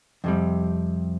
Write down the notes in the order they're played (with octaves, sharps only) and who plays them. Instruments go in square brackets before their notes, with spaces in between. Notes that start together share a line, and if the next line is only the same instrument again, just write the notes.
[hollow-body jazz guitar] F2 C3 G3